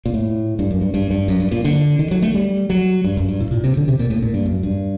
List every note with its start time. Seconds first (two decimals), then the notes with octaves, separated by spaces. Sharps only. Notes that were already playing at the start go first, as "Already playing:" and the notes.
0.06 A#2
0.14 A2
0.59 G2
0.71 F#2
0.81 G2
0.94 G2
1.11 G2
1.28 F#2
1.40 G2
1.52 A#2
1.64 D3
1.99 D#3
2.11 F#3
2.22 A3
2.34 G3
2.70 F#3
3.04 G2
3.17 F#2
3.29 G2
3.40 A2
3.51 A#2
3.64 C3
3.77 D3
3.88 C3
3.99 A#2
4.10 A2
4.22 A#2
4.34 G2
4.45 F#2
4.63 G2